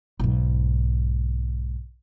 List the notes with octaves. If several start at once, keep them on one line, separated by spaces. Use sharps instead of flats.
B1 G#2